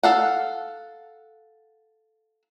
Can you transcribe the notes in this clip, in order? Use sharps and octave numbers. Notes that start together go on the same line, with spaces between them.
A4 F5 F#5